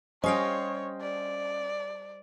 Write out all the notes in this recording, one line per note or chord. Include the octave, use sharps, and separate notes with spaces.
G3 C#4 C5 C#5 D#5 F5 G5
D5